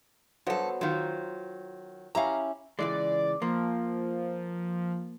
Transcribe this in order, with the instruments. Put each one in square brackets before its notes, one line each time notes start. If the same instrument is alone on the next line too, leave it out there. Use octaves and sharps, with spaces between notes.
[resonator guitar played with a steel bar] G2 A4 [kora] F#3 B3 C5
[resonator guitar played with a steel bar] D#3 F#3 [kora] F4 C5
[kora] C#4 E4 G4 [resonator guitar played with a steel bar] F5 A#5
[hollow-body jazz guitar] C#2 E3 G#3 [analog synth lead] D5
[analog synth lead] F3 [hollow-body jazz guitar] A#3